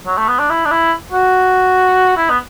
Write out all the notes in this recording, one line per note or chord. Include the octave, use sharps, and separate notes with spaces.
F#3
A3
B3
D4
E4
D4
E4
F#4
E4
B3